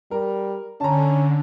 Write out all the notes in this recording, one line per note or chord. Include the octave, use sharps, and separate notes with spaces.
G3 A#4
D3 C#4 A5 A#5